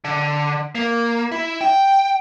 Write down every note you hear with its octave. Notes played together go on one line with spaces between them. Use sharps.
D3
A#3
E4
G5